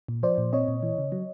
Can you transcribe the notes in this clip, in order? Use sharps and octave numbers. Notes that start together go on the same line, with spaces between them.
A#2
F3 C5 D5
A#2
C4 C#5 D#5
A#2
E3
C#3
F#3